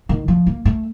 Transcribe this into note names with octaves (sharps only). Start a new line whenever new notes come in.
D#3
F3
A#3
A3